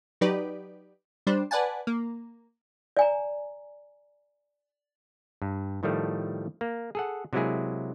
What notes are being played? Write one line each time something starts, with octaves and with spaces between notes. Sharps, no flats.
F#3 D#4 G4 B4 D5
G3 D4 C5
B4 D5 F#5 G#5 A5
A#3
D5 G#5 A#5
G2
A2 D#3 F3 G3 A3
A#3
G#4 A4 F#5
C3 F#3 G#3 A#3 E4 G#4